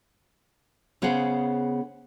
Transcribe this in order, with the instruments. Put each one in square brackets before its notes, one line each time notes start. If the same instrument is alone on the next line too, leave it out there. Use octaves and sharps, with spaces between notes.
[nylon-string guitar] C#3 B3 G#4 C5 F#5